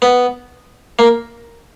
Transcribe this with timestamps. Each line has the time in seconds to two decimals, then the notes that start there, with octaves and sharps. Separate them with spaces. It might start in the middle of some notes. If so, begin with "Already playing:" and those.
0.02 B3
0.99 A#3